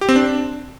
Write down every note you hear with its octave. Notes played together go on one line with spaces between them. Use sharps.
G4
C4
D4